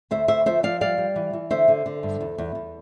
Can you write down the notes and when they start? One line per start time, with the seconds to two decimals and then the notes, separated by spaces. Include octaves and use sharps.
0.11 D2 C5 E5
0.28 D2 C5 E5
0.46 F3 C5 E5
0.63 F3 D5 F5
0.81 G3 D5 F5
0.98 G3
1.16 E3
1.33 E3
1.50 D3 C5 E5
1.68 D3
1.86 D3
2.03 G2
2.21 E2
2.38 E2
2.55 E2